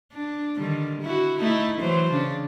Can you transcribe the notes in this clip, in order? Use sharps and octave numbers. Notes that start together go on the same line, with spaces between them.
D4
D3 D#3 G3
E4 F#4
A3 D#4 E4
E3 F#3 C5
C#3 D4